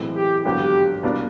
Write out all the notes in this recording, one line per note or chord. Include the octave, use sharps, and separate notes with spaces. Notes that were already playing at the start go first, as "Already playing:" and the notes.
Already playing: B1 A2 E3 G#3 C4
G4
G#1 G2 D3 F#3 B3 G4
C2 B2 G3 A#3 D4